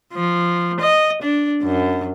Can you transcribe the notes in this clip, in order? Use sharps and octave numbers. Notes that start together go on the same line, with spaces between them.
F3
D#5
D4
F#2